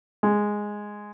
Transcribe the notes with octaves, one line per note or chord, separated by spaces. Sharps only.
G#3